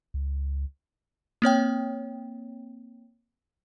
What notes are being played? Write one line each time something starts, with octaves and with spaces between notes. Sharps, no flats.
C#2
A#3 C4 C#5 G5